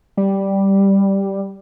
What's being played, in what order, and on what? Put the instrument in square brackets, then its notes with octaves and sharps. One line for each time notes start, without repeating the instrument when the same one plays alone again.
[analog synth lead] G3